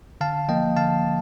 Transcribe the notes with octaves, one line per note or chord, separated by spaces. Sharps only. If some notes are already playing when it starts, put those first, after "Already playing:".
D3 F5 A5
F3 A#3 D#5 G5
D3 F5 A5
F3